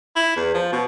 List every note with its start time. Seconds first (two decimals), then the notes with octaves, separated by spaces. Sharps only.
0.16 E4
0.36 E2
0.54 F3
0.73 B2